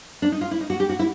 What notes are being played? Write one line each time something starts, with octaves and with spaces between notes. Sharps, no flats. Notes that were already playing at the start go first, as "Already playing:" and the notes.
D4
D#4
F4
E4
D#4
F#4
G4
F#4
E4